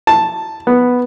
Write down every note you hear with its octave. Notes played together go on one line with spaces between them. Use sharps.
A5
B3